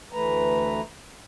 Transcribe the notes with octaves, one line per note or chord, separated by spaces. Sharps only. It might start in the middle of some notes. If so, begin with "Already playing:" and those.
D2 E3 A3 B4 A#5